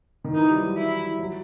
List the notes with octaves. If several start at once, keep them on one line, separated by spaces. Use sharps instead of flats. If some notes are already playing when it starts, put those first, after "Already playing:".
D#3
E3 D#4
G3
F#3
E4
F#3